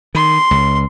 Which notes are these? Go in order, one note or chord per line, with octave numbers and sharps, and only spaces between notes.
D#3 C6
C#2